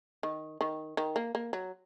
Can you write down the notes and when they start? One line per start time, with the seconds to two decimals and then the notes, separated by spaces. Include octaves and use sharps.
0.23 D#3
0.61 D#3
0.97 D#3
1.16 A#3
1.35 A#3
1.53 F#3